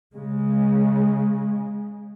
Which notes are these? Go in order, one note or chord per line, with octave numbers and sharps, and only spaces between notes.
C#3 G#3